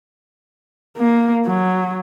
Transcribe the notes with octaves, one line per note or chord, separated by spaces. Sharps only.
A#3
F#3